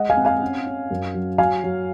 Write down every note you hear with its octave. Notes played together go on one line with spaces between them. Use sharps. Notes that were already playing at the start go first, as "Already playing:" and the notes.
Already playing: G#3 D#5 F#5
F5 G#5
C4
F5 G#5
C#4
C#4
F#2
F#3
F#3 F5 G#5
F#3